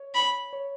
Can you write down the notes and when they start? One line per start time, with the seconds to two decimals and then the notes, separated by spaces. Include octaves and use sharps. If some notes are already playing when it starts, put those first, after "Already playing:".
Already playing: C#5
0.14 B5
0.53 C#5